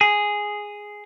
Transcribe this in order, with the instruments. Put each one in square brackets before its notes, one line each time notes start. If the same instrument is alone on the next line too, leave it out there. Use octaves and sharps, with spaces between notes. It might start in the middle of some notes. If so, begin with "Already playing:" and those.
[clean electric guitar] G#4